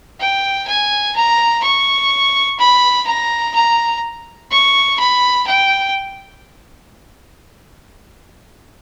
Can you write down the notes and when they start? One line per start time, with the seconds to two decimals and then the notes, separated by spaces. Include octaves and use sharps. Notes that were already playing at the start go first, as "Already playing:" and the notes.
0.20 G5
0.67 G#5
1.15 A#5
1.63 C#6
2.59 B5
3.07 A#5
3.55 A#5
4.51 C#6
4.99 B5
5.47 G5